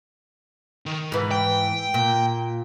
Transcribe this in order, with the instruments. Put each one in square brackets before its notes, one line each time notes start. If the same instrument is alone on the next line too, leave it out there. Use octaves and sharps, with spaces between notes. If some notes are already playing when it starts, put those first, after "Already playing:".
[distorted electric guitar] D#3
[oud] G#2 E3
[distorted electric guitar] G5
[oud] A#2